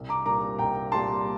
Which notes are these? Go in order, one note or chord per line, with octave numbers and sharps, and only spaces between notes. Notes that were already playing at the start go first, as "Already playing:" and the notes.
Already playing: C2
A#5 D6
A#2 G3 A#3 A#5 D6
C2 G5 A#5
A#2 G3 A#3 A5 C6